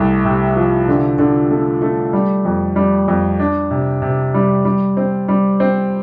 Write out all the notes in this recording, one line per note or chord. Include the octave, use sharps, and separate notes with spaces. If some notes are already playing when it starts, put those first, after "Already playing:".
Already playing: C2 A3
C3
F3
D3
D3
A3
A3
G3
F2
G3
F2
D4
C3
C3
G3
G3
C4
G3
C4